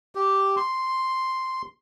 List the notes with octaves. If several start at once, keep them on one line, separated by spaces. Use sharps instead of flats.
G4
C6